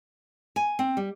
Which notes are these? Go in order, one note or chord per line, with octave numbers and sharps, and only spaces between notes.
G#5
C4
G3